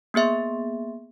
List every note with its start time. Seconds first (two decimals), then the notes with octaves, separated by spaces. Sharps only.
0.14 A#3 B3 G#4 E5 C6